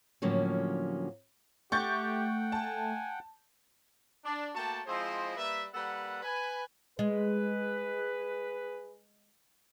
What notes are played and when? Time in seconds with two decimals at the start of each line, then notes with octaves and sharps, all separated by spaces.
0.22 A2 D3 F3 F#3 A#3 C#4
1.72 A3 G4 F#5 G5 C#6 G6 A6
2.52 G#5 A5
4.25 D4
4.55 A3 A#3 F#4 G5 A5
4.87 F3 G#3 C4 E4 C5 D#5
5.37 G3 A#3 B4 E5
5.74 G3 A#3 A4 B4 F#5
6.23 B4 G#5
6.99 G#3 G#4 B4